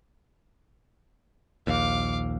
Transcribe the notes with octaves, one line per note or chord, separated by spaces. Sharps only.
A#1 D#2 F5 D6